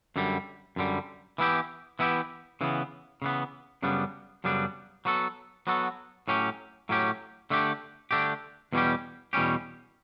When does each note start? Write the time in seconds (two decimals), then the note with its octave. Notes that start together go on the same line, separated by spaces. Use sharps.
0.16 F#2 D3 G3
0.76 F#2 D3 G3
1.38 E3 B3 E4 G4
1.99 E3 B3 E4 G4
2.61 C#3 E3 B3
3.22 C#3 E3 B3
3.82 F#2 C#3 G3 B3 D4
4.44 F#2 C#3 G3 B3 D4
5.05 F#3 B3 F#4 A4
5.67 F#3 B3 F#4 A4
6.28 A2 F#3 C#4 G4
6.89 A2 F#3 C#4 G4
7.50 D3 A3 D4 G4
8.11 D3 A3 D4 G4
8.73 E2 B2 G3 C#4 G4
9.33 E2 B2 G3 C#4 G4